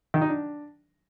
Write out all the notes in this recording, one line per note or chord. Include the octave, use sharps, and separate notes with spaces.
D#3
D#4
D4